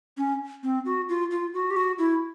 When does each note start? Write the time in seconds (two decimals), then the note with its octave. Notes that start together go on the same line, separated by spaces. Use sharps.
0.17 C#4
0.63 C4
0.86 F#4
1.09 F4
1.31 F4
1.54 F#4
1.70 G4
1.76 F#4
1.98 E4